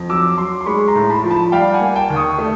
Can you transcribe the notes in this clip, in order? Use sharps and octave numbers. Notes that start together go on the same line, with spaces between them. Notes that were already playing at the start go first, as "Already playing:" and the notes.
Already playing: F2
F#3 D6 E6
F#3 C6 D6
C6
G#3 B5 C#6
A#5 C6
A2
A5 B5
F3
A5 B5
G3 F5 G5
F#5 G#5
A#3
G5 A5
D#2
C#6 D#6
A3